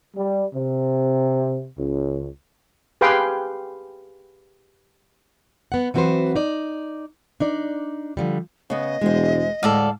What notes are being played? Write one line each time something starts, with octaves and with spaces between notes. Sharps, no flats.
G3
C3
C#2
G4 G#4 B4 F5 G5 C6
B3 F#5
E3 F#3 C4 F#4 B4 C5
D#4 D5
D4 D#4 D5
D3 F3 G3
C#3 B3 D#5
E1 G#3 C5
D2 A2 G#3 A4 D5 F5